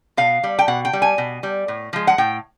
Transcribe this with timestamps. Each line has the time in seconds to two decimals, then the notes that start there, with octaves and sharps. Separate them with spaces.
0.17 B2 F5
0.43 G3
0.59 G5
0.68 B2 F#5
0.85 G5
0.93 G3
1.02 G#5
1.18 B2
1.43 G3
1.68 A2
1.93 F3 G#3
2.07 F#5
2.18 A2 G5